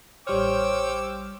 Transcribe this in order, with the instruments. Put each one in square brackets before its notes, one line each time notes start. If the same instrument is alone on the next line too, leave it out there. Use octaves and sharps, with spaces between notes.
[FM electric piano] A1 G3 F6 [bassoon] C5 [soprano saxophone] C#5 [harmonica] G5 D6 E6